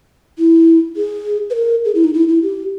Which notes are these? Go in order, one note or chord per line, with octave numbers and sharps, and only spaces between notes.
E4
G#4
B4
A#4
G#4
E4
D#4
E4
E4
G4